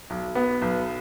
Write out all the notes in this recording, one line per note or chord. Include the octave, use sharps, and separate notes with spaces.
B1
B3
B1